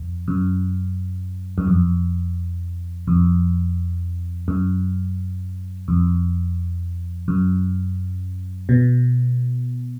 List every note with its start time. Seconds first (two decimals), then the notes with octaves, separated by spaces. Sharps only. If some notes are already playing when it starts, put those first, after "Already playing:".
Already playing: F2
0.28 F#2
1.58 F#2
1.67 F2
3.08 F2
4.48 F#2
5.88 F2
7.28 F#2
8.69 B2